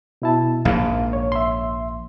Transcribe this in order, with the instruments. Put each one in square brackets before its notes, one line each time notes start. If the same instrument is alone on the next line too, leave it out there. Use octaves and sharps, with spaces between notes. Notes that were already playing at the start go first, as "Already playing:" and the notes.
[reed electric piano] B2 E4 A5
[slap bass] A#1 G#2 [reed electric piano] F5
[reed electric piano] C#5
E5 C6